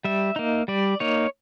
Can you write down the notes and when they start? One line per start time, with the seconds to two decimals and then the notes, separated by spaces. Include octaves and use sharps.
0.04 G3 E5
0.36 A#3 D#4
0.68 G3 D5
1.00 A#3 D#4 C#5